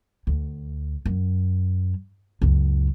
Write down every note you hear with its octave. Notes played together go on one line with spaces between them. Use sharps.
D2
F#2
C#2 F#2